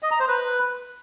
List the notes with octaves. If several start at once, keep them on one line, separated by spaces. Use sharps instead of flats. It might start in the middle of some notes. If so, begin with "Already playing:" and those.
D#5
A#5
C5
B4